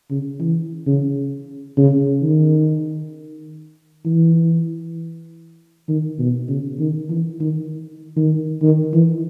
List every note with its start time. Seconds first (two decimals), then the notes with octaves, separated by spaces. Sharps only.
0.10 C#3
0.40 E3
0.86 C#3
1.78 C#3
2.23 D#3
4.05 E3
5.88 D#3
6.19 B2
6.49 C#3
6.79 D#3
7.10 E3
7.40 D#3
8.16 D#3
8.62 D#3
8.93 E3